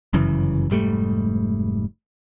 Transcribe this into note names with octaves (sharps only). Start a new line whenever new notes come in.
G1 F#2 C#3 E3
F1 G#2 G3 A3